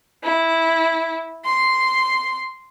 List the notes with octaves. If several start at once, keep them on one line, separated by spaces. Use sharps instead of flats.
E4
C6